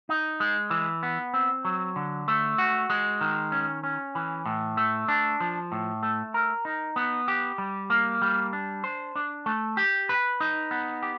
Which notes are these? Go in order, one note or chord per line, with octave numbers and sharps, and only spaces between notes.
D#4
G#3
E3
B3
C4
F#3
D3
A3
F#4
G#3
D#3
C#4
C#4
E3
A2
A3
D4
F3
A2
A3
A#4
D#4
B3
G4
G3
A#3
G3
D4
C5
D4
A3
G4
B4
D#4
B3
G4